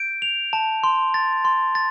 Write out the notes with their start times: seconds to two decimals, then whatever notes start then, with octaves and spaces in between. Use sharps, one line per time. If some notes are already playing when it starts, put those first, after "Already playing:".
Already playing: G6 D7
0.22 F7
0.53 A5
0.84 C6
1.14 A6
1.45 C6
1.75 A6